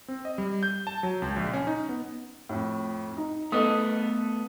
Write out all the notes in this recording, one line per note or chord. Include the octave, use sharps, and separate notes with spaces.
C4
D#5
G3
G6
A5
F#3
C#2
A#1
C#4
D#4
B3
F2 A2
D#4
A3 B3 A4 D#5 D#6